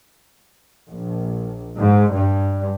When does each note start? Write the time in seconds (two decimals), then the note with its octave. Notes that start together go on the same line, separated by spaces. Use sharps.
0.91 A#1
1.78 G#2
2.12 G2